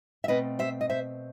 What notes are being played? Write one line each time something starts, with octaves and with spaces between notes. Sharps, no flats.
E5
B2 A3 C4 B4 D#5
C5 E5
D#5
C5 E5